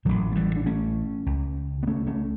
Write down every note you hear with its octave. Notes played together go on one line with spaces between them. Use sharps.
A1 A2 D3 F#3
A3
E3 G3
D4
A3 C#4
C#2 C#3
B3
A3 C#4
A3 C#4